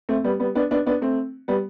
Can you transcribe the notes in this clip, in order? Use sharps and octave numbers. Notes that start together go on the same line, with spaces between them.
A3 C4
G3 B3
G3 B3
B3 D4
B3 D4
B3 D4
A3 C4
G3 B3